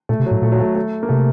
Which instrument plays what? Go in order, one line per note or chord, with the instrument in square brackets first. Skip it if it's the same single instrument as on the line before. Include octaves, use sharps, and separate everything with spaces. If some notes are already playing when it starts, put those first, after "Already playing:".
[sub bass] A#2 [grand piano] A3
[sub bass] C3
[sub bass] A2 [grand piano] F#3
[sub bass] A#2 [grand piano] A3
[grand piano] F#3
A3
A3
A#3
[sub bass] C3 [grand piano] A3